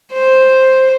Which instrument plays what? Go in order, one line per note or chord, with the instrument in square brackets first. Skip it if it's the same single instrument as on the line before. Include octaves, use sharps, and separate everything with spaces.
[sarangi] C5